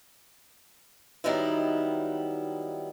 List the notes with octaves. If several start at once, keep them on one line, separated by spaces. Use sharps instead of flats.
D#3 F#3 G3 B3 D#4 E4